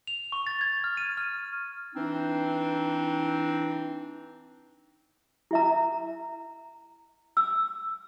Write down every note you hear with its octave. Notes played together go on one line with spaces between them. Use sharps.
F7
C#6
A6
G#6
F6
D#7
F6
E3 C4 D4 D#4
E4 E5 A#5
E6